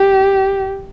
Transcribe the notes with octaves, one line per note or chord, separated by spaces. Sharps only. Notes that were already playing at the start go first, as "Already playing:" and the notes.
Already playing: G4